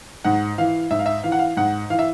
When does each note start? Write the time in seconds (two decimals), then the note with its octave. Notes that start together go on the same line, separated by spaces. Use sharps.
0.25 G#2 F#5
0.58 E3 F5
0.91 G#2 E5
0.99 F5
1.06 E5
1.24 E3 F5
1.32 F#5
1.39 F5
1.57 G#2 F#5
1.90 E3 F5
1.99 E5